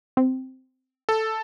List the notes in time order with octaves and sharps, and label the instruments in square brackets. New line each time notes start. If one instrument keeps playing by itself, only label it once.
[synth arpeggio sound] C4
[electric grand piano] A4